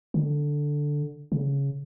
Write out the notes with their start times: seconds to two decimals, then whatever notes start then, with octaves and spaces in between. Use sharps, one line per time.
0.14 D3
1.32 C#3